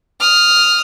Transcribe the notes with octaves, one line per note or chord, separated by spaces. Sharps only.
D#6 F6